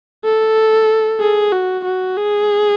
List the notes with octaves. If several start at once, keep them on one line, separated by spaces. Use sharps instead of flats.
A4
G#4
F#4
F#4
G#4